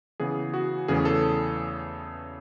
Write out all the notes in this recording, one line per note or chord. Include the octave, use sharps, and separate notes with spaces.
C#3 E3 B3 G#4
F#4
E2 C#3 E3 A3 C#4 G#4
A4